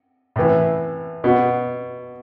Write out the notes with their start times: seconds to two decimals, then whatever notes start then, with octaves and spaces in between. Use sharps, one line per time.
0.36 A2 E3
1.24 B2